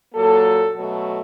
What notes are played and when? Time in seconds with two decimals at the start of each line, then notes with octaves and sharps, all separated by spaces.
0.15 A#2 F#3 A#3 A4
0.74 B2 F#3 A3